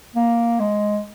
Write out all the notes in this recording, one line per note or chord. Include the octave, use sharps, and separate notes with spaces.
A#3
G#3